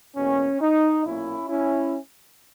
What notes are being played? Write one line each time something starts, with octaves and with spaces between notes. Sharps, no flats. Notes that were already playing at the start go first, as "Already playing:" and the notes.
E2 B2 A#3 C#4
D#4
B1 A#2 A#3 C#4 E4
C#4 E4